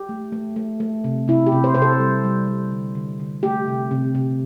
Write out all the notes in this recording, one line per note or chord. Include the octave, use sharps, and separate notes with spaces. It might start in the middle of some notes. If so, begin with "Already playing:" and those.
Already playing: G4
A3
A3
A3
A3
C3
C3 E4
G4
C3
C5
C3 C5
A4
G3
G3
G3
D3
D3
D3
A3 G4
C3
C3
C3